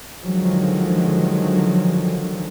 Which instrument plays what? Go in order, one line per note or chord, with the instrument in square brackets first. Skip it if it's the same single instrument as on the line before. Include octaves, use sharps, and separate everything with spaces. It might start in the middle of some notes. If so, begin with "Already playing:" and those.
[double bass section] D3 D#3 F3 F#3 G#3